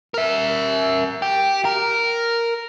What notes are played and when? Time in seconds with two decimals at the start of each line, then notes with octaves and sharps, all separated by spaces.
0.14 A#4 E5
1.22 G4
1.65 A#4